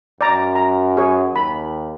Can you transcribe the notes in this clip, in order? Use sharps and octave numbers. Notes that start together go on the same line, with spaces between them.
F#2 D5 A#5
A#5
G#4 C#5
D#2 B5